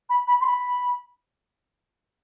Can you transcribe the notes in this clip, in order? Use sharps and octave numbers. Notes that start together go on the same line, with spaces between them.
B5
B5
C6
B5